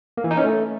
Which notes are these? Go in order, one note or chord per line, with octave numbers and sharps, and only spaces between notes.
A#3
E3
D#4
C#4
A3